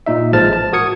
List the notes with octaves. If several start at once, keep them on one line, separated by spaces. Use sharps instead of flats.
A#2 D#4 E5
A1 F3 G#3 A5 F6 A6
A5
F#4 A#4 D#6 G#6 C#7